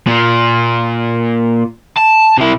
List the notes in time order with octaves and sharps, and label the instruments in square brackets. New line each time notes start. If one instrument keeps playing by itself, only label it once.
[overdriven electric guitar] A#2
A5
C3 E4